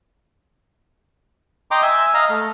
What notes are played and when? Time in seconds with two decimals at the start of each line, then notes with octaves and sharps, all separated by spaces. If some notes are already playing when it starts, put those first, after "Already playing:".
1.71 D#5 G5 A#5 C6 D6
1.82 E5 G#5 E6
2.14 D#5 F5 A#5
2.30 A3 F6